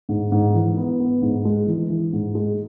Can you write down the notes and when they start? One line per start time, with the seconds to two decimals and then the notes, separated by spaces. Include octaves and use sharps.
0.09 G#2
0.32 G#2
0.54 E3
0.77 B3
1.00 B3
1.22 G#2
1.45 G#3
1.67 E3
1.90 E3
2.13 G#2
2.35 G#3